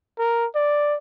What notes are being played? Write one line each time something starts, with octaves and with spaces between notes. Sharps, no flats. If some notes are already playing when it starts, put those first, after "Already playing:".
A#4
D5